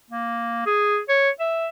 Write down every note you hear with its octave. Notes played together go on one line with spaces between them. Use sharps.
A#3
G#4
C#5
E5